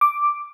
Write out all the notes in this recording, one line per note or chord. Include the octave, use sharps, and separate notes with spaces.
D6